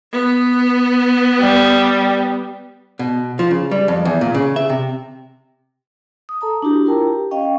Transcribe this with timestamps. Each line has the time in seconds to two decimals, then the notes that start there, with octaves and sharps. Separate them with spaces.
0.12 B3
1.40 G3
2.99 B2
3.39 F3
3.51 C#3
3.71 G3
3.88 F2
4.05 E2
4.21 A#2
4.34 C#3
4.56 E5
4.70 C3
6.29 D#6
6.41 A4 A5 A#5 D#6
6.62 D4 E4 F#4 G4
6.85 E4 F4 A#4 G5 A5 A#5
7.07 G4
7.31 C#4 D#5 F5 G5 C#6